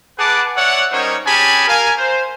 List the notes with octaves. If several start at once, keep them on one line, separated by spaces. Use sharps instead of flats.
G#4 B4 F#5 A5 D6
C#5 D5 E5 F#5
G3 C#4 D#4 A#4 C5 C#5
C#4 G4 G#4 G#5 A5 B5
A#4 F5 G#5
C5